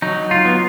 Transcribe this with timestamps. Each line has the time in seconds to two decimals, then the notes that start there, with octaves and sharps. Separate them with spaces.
0.02 F#3 D#4
0.31 F4
0.45 B3